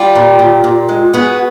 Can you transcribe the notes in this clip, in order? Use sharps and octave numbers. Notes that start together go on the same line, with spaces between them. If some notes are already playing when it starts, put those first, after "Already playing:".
Already playing: G3 F4 G4
A#2
A#2
A#2
G#3
B3 F#4 G#4